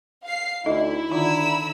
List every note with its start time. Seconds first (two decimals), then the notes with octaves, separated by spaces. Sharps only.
0.24 F5 C7
0.66 D2 D#4 E4 A4 D#5
1.11 D3 D#3 D#4 F4 A#5 B5 E6